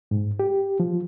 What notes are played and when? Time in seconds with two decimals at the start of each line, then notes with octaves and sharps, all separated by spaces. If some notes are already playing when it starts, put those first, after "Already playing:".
0.11 G#2
0.39 G4
0.80 F3